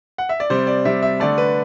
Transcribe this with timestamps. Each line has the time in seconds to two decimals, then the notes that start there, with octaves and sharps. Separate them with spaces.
0.18 F#5
0.29 E5
0.40 D5
0.50 C3 G3 C5
0.67 D5
0.85 C3 G3 E5
1.02 E5
1.20 D3 A3 D5
1.38 B4